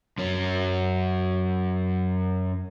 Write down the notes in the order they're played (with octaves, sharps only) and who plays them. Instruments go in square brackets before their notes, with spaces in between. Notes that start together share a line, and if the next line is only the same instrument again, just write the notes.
[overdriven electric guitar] F#2 C#4